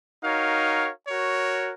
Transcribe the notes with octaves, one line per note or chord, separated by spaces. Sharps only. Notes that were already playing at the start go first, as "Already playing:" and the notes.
D#4 F#4 A#4 C#5 F5
F#4 A#4 C#5